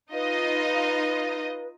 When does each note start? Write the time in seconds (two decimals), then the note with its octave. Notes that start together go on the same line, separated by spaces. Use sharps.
0.14 D#4 F4 B4 D#5